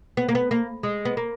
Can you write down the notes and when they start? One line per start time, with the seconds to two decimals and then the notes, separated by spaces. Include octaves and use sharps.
0.17 B3
0.29 A#3
0.35 B3
0.51 A#3
0.83 G#3
1.05 B3
1.17 A#3